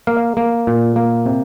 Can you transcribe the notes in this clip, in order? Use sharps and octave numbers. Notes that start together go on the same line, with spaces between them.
A#3 F5
A#3
A#2
A#3
C3